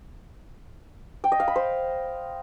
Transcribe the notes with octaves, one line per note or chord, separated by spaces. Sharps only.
G5
D#5
F5
B5
C5